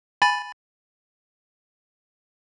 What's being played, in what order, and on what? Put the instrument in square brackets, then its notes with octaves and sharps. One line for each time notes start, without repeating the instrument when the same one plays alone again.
[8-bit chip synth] G#5 B5 A6